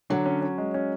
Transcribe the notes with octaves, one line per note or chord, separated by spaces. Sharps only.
D3 F#3
C#4
C#4
G#3
C#4